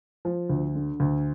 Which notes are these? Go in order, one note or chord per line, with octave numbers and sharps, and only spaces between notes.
F3
D2
D3
D2